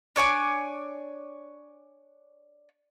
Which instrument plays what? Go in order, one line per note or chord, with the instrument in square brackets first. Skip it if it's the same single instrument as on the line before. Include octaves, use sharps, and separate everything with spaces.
[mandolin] D4 C#5 G#5 D6